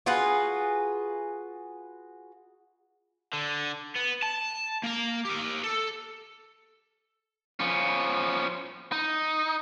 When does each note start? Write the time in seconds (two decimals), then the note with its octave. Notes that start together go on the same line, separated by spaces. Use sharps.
0.06 F4 F#4 G#4 B4
3.33 D3
3.96 B3
4.23 A5
4.83 A#3 A#5
5.25 G4 A#4
5.64 A4
7.60 F3 C#4
8.92 D#4